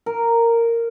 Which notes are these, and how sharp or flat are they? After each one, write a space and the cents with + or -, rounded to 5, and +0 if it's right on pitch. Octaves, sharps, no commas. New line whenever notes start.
A#4 -10